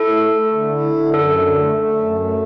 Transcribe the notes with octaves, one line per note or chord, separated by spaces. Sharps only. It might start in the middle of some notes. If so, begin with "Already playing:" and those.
Already playing: E4 A4
A3
A3
D3
E4
D3
F#2 A4
D3
A3
A3
F#2
A3